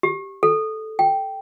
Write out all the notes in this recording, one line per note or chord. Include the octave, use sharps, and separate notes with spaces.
G4
A4
G5